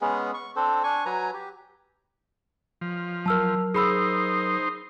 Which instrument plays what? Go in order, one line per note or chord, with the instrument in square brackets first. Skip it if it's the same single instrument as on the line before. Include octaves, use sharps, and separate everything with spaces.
[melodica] G#3 B3 C#4 G#4
C#6
C4 D4 A4 C5
D4 G#5 C#6
F#3 B4 G#5 A#5
G4
[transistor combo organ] F3
[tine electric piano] F#3 A#4 [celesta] A5 E6 F6
[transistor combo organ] D#4 C5 [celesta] G#4 B5 E6